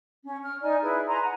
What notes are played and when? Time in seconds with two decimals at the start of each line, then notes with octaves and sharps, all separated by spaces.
0.24 C#4
0.42 F6
0.61 D#4 D5 G#5
0.81 E4 G#4 B4
1.07 B4 G#5 A#5 C6
1.23 F#5